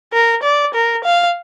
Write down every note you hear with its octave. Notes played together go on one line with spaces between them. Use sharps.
A#4
D5
A#4
F5